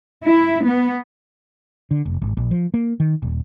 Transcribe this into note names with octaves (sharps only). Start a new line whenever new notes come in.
E4
B3
D3
F1
G#1
A#1
F3
A#3
D#3
D#1